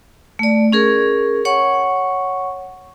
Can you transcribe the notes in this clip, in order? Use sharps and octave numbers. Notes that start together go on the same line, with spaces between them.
A3 D5
C#4 G#4 A#4
C#5 F#5 C#6